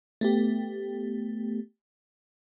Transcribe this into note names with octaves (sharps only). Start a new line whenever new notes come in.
A3 B3 G4